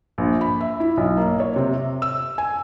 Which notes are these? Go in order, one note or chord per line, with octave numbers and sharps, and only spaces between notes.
A#1
B5
E5
E4
B1
A#3
C#5
C3
E5
E6
G#5